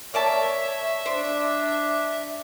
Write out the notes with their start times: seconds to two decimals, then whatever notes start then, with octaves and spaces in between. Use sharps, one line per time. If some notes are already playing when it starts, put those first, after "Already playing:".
0.14 A#3 C#5 D5 E5 A5
1.06 D4 C5 D5